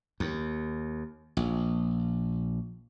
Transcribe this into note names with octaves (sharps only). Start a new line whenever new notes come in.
D#2
A#1